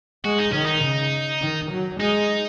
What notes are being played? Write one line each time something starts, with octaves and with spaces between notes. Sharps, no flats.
G#3 F#4
D#4
D#3 C#4
D#4
C#3
D#3
F#3
G#3 D#4